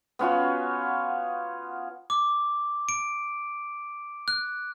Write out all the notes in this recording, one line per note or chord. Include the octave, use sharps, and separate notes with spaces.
B3 C#4 F4 F#4
D6
D7
F#6